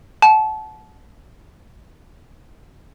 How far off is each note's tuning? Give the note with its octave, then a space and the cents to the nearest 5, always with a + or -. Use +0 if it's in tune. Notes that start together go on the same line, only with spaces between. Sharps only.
F#5 +0 A5 -25